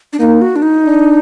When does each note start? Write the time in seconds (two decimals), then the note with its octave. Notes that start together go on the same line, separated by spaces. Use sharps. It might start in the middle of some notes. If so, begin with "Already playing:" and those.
0.13 D4
0.19 A#3 D#4
0.41 F#4
0.56 D4
0.62 D#4
0.84 D4